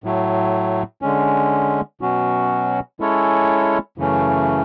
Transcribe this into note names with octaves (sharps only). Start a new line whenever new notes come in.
A2 F#3 A3
D3 G#3 C#4
B2 F#3 C#4 F#4
G#3 C#4 E4 A4 C#5
F#2 C#3 E3 A3 C#4